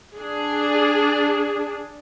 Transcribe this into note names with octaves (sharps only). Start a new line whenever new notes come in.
D4 G#4